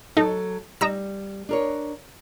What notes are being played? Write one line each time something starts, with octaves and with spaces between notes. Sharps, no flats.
F#3 D#4 A4
G3 D#4 A#5 E6
D4 A#4 C#5